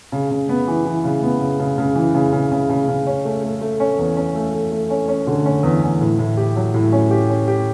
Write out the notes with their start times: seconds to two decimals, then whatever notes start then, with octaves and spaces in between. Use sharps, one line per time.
0.12 C#3
0.31 C#3
0.49 B3
0.68 E3
0.85 E3
1.04 C#3
1.22 B3
1.41 C#3
1.60 C#3
1.78 C#3
1.95 E3
2.15 C#3
2.33 C#3
2.52 C#3
2.69 C#3
2.88 C#3
3.07 C#4
3.25 A3
3.43 A3
3.61 A3
3.80 C#4
3.98 E2
4.17 C#4
4.35 A3
4.54 A3
4.72 A3
4.90 C#4
5.08 C#4
5.27 D3
5.46 C#4
5.63 E2
5.82 E2
6.01 A2
6.19 A2
6.37 G4
6.56 F#3
6.74 A2
6.92 C#4
7.11 G4
7.30 C#4
7.48 G4